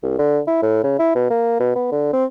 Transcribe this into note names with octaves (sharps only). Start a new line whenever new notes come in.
C2
D3
E4
A2
C#3
E4
B2
A#3
B2
B3
D3
C4